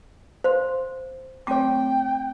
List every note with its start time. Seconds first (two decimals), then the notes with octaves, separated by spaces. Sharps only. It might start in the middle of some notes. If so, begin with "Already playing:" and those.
0.44 C5 F5 C6
1.47 A3 C4 C#5 G5 D6